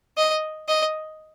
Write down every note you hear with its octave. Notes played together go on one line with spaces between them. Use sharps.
D#5
D#5